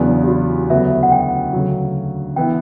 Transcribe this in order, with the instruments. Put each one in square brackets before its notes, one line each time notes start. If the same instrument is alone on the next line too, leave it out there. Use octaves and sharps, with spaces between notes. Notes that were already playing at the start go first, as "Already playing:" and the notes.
Already playing: [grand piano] E2 C#3 F#3 B3 D4 [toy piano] E4
[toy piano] G4
F#4
[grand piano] D2 C#3 F#3 B3 [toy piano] E5
[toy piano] F#5
G5
[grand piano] D2 C#3 F#3
[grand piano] E3 B3 E4 [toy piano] G5